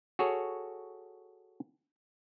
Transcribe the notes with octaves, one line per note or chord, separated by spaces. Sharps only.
F#4 G#4 A4 C#5